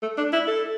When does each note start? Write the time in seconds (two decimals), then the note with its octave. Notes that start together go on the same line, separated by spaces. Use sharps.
0.03 A3
0.17 D4
0.33 E4
0.48 A4